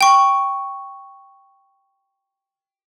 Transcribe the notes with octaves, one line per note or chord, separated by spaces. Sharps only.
G5 C#6